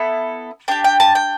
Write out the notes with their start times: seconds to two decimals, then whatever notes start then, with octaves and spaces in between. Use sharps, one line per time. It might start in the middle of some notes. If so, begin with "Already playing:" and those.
Already playing: B3 E4 A4
0.68 D4 G4 G5
0.84 G5
1.00 A5
1.15 G5